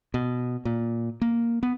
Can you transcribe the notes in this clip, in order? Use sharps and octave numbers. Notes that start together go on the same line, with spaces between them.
B2
A#2
A#3
B3